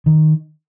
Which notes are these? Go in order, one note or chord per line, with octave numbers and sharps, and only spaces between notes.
D#3